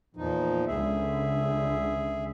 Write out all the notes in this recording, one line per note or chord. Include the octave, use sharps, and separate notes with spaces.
E2 A#2 F3 D#4
C#2 D3 G#4 E5